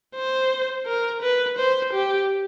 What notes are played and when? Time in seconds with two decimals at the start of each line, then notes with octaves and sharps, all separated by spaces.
0.15 C5
0.86 A#4
1.22 B4
1.58 C5
1.93 G4